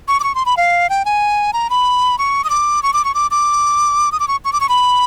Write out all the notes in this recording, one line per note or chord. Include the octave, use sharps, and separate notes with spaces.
C#6
D6
C#6
C6
B5
F5
G5
G#5
A#5
B5
C#6
D#6
D6
C#6
D6
C#6
D6
D6
D#6
D6
C#6
C#6
D6
C#6
B5